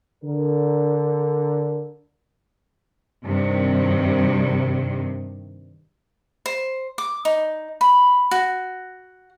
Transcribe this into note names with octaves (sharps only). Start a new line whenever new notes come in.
D3 A#4
G2 C3 D#3
C5
D6
D#4
B5
F#4